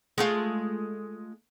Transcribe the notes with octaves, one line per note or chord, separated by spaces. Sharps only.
G#3 A3 F4